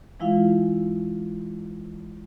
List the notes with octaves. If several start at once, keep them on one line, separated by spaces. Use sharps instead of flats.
E3 G#3 E4 F4 F5